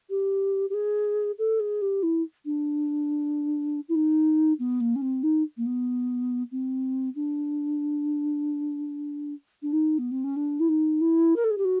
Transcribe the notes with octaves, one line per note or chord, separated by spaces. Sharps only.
G4
G4
G#4
A4
G#4
G4
E4
D4
E4
D#4
B3
A#3
C#4
C4
D#4
A#3
B3
C4
D4
D4
D#4
B3
C4
C#4
D4
E4
D#4
E4
A#4
A4
G#4
G4
F#4